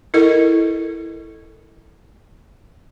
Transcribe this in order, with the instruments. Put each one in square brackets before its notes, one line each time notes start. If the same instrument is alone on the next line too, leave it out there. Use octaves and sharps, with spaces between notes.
[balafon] E4 A4 A#4 D#5